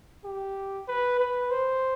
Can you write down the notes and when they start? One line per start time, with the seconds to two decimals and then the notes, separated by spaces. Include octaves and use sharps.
0.24 G4
0.88 B4
1.20 B4
1.51 C5